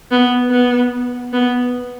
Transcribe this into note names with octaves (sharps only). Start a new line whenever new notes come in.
B3
B3
B3